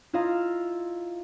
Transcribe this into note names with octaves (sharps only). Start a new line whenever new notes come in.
E4 F4 D#5 F5 A#5